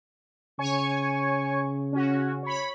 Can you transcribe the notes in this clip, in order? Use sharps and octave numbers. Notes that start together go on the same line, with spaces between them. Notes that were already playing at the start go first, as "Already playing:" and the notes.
C#3 C#5 G#5 C#6
C#4 F#4
C#5 B5